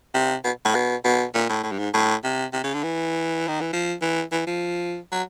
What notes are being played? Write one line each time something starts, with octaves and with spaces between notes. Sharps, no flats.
C3
B2
A2
B2
B2
A#2
A2
A2
G2
G#2
A2
C3
C3
C#3
D3
E3
D#3
E3
F3
E3
E3
F3
F#3